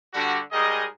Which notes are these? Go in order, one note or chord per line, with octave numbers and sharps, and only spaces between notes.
D3 G3 F#4
G#2 G3 G#4 A#4 D#5